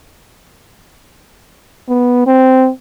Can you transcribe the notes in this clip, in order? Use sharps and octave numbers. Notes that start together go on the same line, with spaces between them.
B3
C4